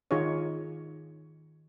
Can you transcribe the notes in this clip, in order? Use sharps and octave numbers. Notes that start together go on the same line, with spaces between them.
D#3 D#4 F4 G#4 C#5